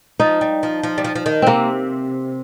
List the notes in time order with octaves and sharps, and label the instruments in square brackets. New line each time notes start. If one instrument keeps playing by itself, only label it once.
[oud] F3 [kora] D#4
[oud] G3
F3
F3
G3
F3
F3
D#3
[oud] C3 [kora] A#3 C4